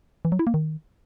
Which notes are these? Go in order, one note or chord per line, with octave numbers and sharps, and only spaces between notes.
E3
F#3
E4
A#3
D#3